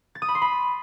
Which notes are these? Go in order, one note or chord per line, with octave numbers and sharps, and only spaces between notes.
A6
D#6
B5
C6
B5